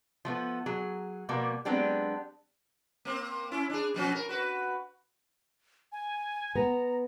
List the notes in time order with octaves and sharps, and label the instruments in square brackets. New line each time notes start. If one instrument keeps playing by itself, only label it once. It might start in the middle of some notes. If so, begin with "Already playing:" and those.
[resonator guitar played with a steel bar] F3 A3 B3
F#3 G#4
B2 F3 G3 A#3 B3
F#3 G#3 B3 C4 D4 G4
[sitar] A#3 C4
C#4 E4
D4 G#4
B2 F3 C#4
A#4
F#4 B4
[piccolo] G#5
[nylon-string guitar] B3 [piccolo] A#5